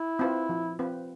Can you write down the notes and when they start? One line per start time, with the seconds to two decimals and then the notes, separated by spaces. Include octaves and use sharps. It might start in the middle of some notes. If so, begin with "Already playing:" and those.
Already playing: E4
0.19 C4 F4 B4
0.49 F3
0.79 C4 F4 B4